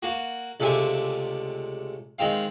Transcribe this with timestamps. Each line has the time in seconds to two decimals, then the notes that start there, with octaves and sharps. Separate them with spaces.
0.03 A#3 F#4
0.60 C#2 C3 A3 D5 E5 G#5
2.19 D#3 G#3 C4 F5